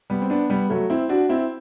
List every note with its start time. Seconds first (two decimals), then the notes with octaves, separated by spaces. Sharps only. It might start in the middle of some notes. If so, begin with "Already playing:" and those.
0.10 G3 B3
0.21 C4
0.30 B3 D4
0.50 G3 B3
0.70 F#3 A3
0.90 C4 E4
1.09 D4 F#4
1.29 C4 E4